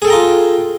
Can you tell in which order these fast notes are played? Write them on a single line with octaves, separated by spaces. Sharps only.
G#4 A4 G5 A#5 F4